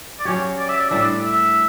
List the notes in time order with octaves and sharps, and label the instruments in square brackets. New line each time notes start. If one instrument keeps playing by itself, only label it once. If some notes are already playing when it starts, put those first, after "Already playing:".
[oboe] D5
[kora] F#3 C#4 G4 [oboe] C#5
[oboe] D5
E5
D5
[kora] A2 G3 D4 [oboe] E5
[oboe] D5
E5